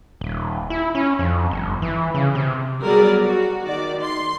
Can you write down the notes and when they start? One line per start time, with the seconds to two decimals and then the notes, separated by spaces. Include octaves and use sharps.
0.21 D#1
0.70 E4
0.95 C#4
1.19 F2
1.51 G1
1.82 E3
2.14 C#3
2.35 C3
2.81 F#3 G3 B3 G#4 A#4 D5
3.23 F#4
3.64 D#3 D5
4.02 C6